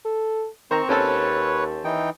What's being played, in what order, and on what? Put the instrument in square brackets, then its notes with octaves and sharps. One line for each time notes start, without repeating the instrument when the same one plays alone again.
[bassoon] A4
[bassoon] D#3 [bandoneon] C4 C#6 [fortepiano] C5 A#5
[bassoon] D#2 [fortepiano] C4 C#4 A4 [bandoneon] B4 C#5
[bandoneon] E3 D#4 G5